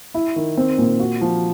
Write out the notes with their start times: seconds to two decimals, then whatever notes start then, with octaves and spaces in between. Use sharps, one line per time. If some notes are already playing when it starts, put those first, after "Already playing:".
0.14 E4
0.36 D#3
0.57 C4
0.78 A#2
1.00 F#4
1.21 F3